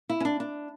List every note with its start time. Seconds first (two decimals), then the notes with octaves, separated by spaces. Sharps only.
0.09 E4
0.20 C#4
0.25 D4
0.40 D4